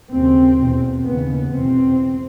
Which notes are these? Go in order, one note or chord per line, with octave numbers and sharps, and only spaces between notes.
D#2 C#3 C4
E2 B2
D#2 C#3 B3
E2 B2 C4